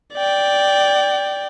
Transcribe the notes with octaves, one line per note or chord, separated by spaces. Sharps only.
D5 G5